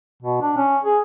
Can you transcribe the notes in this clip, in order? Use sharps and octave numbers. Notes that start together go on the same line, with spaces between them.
B2
D4
C#4
G#4